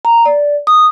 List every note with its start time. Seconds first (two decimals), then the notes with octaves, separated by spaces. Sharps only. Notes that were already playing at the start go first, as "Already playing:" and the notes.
0.05 A#5
0.25 D5
0.67 D#6